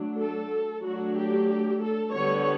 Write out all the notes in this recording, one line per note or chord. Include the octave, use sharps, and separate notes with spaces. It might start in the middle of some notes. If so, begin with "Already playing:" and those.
Already playing: F#3 A3 D4
A4
F#3 A3 D4 F#4
G4
A4
D3 G3 B3 C#5